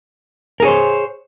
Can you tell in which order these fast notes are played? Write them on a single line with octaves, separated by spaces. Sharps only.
A#4 G#4 C#5 C5